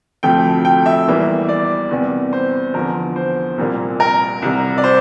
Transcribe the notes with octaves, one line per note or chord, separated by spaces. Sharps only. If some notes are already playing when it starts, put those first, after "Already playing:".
D2 C3 F3 A3 G5
G5
E5
E2 E3 G3 A#3
D5
E2 C3 G3
C5
E2 D3 F3 A#4
C5
C2 A#2 G3 A#3
A#4
C2 C3 G3
D5
C5